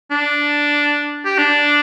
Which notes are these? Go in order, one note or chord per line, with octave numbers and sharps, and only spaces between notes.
D4
G4
D4